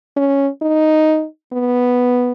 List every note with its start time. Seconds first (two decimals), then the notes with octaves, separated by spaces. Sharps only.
0.17 C#4
0.62 D#4
1.53 B3